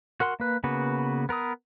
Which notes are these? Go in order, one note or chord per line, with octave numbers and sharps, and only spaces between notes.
F#4 A#4 F#5 C6
A#3 B4
C#3 A#3 B3 F#4 B4
B3 A#4 B4 D#6